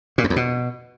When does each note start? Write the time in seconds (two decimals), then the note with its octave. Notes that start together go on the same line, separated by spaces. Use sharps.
0.18 A#2
0.24 F#2
0.30 E2
0.36 B2